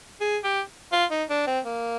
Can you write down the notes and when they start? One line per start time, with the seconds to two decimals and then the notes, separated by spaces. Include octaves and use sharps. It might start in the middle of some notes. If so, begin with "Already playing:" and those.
0.20 G#4
0.44 G4
0.92 F4
1.11 D#4
1.29 D4
1.47 C4
1.65 A#3